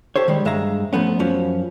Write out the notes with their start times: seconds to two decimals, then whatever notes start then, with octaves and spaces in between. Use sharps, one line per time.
0.16 G4 A4 C5 C#5
0.28 D#3 G3 G#3
0.45 G2 G#3 E5 F5 A#5
0.93 F3 A3 B3 C#4
1.19 F#2 F3 C#4